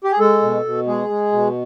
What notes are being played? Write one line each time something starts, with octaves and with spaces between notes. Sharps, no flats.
G4
G#4
G#3 A4
B2
B2
G#3 G#4
G#3
B2